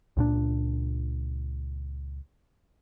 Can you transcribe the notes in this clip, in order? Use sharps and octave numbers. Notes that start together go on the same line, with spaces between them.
C#2 A#2 D4